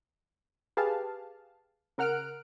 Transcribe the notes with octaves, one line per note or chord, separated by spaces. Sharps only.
G4 G#4 B4 F5 A5
C#3 A#4 F#5 F6 F#6 D7